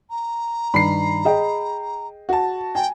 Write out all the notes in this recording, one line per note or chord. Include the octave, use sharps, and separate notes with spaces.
A#5
G2 D#3 B5 C7
G#4 D#5 G5
F#4 A5
G5 G#5